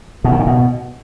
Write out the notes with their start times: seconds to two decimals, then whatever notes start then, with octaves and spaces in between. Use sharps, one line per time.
0.24 B2
0.32 D#3
0.39 A#2
0.47 B2